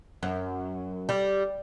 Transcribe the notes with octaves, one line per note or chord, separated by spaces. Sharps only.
F#2
G3